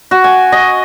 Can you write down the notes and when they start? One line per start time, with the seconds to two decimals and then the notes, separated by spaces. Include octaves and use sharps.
0.11 F#4
0.24 G#5
0.52 D#5